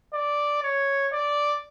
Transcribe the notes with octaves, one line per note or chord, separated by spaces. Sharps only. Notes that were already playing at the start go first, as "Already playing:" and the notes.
D5
C#5
D5